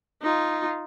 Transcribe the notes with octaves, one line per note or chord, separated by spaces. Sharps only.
D#4 F4